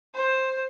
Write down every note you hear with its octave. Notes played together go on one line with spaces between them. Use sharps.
C5